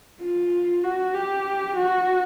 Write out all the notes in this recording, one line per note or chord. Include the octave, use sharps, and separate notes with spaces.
F4
F#4
G4
F#4